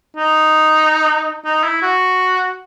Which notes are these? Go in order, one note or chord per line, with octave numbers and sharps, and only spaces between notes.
D#4
D#4
E4
F#4